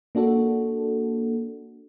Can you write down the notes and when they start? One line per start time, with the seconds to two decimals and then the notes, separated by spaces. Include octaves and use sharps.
0.15 A#3 D4 F#4 A4